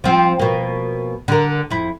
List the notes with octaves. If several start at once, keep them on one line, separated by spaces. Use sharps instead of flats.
F3 C4
B2 A#3
D3 A#4
F2 E4